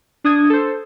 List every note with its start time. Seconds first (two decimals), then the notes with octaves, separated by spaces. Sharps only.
0.24 D4 D#6 G#6
0.50 A4 C5